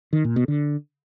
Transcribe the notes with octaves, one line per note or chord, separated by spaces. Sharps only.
D#3
A#2
B2
D3